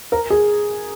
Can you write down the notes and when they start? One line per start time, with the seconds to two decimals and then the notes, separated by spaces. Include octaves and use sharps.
0.12 A#4
0.30 G#4